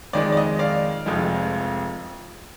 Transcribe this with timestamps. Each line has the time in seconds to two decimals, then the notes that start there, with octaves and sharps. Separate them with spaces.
0.13 F2 D#3 G#3 D5
0.32 D5
0.37 D#5
0.59 D5 F5
1.06 F1 F2 F3 G#3